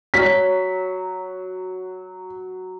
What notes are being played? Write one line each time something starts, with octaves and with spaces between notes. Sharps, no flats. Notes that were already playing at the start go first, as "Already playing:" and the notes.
F#3 B6